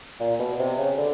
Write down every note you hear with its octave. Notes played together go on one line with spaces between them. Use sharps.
A#2
B2
C3
C#3
D3